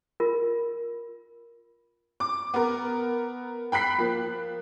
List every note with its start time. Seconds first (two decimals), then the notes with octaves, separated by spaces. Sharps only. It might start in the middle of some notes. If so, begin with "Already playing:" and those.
0.20 F4 A#4
2.20 D6
2.54 B3 A#4
3.72 G5 B5 F#6 B6 C7
3.98 F3 A#3